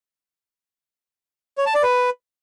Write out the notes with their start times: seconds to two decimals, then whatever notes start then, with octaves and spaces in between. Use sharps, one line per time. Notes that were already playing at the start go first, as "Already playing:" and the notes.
1.58 C#5
1.66 A5
1.74 D5
1.83 B4